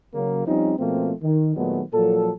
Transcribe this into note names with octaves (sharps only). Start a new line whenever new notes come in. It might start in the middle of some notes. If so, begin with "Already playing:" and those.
C#3 F#3 A#3
F3 G3 C4 C#4 D#4
B2 F3 A3 A#3 C4
D#3
A#2 D#3 F#3 G#3 A3 B3
A#2 F3 F#3 A4